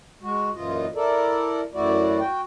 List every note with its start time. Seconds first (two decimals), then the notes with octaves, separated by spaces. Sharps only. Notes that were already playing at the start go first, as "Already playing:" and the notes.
0.22 G#3 F#4
0.55 F#2 A#2 E3 F4 D#5
0.95 E4 A4 A#4 D5
1.74 F#2 E3 A3 E4 F#4 D5
2.20 F#4 G5